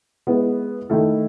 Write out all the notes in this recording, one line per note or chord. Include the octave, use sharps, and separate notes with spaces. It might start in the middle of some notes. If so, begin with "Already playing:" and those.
G#3 B3 E4 B4
D#3 A3 E4 A4